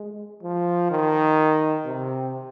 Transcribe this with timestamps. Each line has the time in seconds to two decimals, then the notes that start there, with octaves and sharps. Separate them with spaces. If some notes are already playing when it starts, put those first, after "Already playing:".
Already playing: G#3
0.43 F3
0.90 D#3
1.85 C3